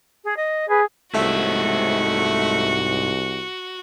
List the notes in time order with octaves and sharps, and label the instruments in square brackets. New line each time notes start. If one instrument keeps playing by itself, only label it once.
[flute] G#4
D#5
[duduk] G#4 [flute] B4
[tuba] C2 [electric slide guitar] G#2 E5 [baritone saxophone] A3 [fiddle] F#4